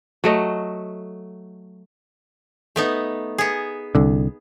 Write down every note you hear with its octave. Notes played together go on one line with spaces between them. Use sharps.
F#3 A3 D#5
A3 B3 D#4
B3 G#4
C2 D3